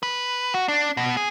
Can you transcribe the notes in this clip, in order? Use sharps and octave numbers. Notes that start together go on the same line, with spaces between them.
B4
F#4
D4
B2
G#4